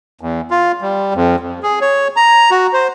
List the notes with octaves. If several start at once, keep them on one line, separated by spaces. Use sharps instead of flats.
E2
F4
G3
F2
F2
G#4
C#5
A#5
F#4
C5